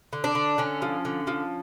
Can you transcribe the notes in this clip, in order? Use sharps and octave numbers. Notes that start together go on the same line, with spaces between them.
D3
D4
D3
D3 C#4
F3
D3
F3